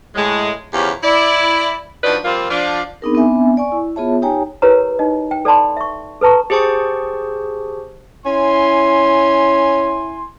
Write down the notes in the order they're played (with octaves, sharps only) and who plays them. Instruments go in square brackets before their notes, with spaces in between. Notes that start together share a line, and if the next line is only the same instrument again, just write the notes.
[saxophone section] A2 G#3
E2 C#3 F3 C#4 G4
E4 D5
F3 D4 D#4 F#4 B4 D5
F3 G3 A#3 C4 F4
F3 D4 F4
[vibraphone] B3 C4 D4 D#4 G#4 A#4
B3 C4 D4 E5 G#5
D5 G#5 C#6
E4
B3 F4 G#4 C#5 E5 A5
D#4 G4 C#5 G5 G#5 A#5
[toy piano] E4 G4 A#4 B4 C#5 A#5
D#4 D#5
G5
A4 D5 G5 A5 B5 C6
E5 C#6
A4 B4 A5 A#5 C#6
[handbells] G4 G#4 C5 A5 C#6
[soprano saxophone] C#4 [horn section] E4 G#5 C6